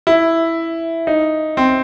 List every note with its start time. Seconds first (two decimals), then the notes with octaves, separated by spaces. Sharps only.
0.07 E4
1.07 D#4
1.57 C4